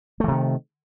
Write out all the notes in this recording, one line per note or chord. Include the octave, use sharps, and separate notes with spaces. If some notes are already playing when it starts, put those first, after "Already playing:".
C3 D#3 E3 A3